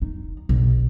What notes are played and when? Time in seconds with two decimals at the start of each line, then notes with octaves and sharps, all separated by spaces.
0.02 D#4
0.49 B1